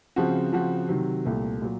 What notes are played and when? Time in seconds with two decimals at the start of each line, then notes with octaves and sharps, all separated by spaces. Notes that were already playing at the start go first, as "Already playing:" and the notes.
0.16 C#3 F3 C4 F#4
0.52 C#3 F3 C4 F#4
0.89 C3 D#3 F#3
1.25 C2 A#2 A3
1.61 A#2 F#3